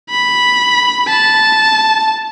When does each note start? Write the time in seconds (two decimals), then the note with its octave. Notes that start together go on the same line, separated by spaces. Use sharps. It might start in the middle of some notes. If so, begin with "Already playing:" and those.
0.09 B5
1.08 A5